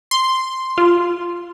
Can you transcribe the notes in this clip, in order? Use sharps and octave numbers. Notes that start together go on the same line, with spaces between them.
C6
F4